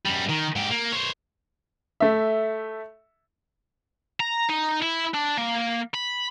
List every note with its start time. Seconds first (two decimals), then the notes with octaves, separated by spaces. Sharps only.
0.06 F#2 G3
0.29 D#3
0.56 G#2 G4
0.71 A#3
0.93 C5 C#5
2.00 A3 E5
4.20 A#5
4.50 D#4
4.82 E4
5.14 D4
5.38 A#3
5.94 B5